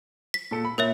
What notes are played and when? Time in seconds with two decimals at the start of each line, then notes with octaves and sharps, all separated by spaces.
0.34 B6
0.51 A#2 A4 C#7
0.65 B5
0.78 A#2 A#4 C#5 E5